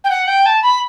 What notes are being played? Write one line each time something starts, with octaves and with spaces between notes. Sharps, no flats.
G5
F#5
G5
A5
B5